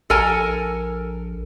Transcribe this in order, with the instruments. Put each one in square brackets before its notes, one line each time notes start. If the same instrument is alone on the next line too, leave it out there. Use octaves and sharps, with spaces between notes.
[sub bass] A#1 [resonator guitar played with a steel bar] A4 A#4 G#5